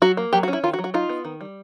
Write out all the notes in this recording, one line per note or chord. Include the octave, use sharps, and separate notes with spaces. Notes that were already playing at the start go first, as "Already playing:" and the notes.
F#3 F#4
A#3
F#3 G4
F#4
C#4
E4
D#3 F4
F#4
F#3
F#4
D#4 F4
B3
D#3
G3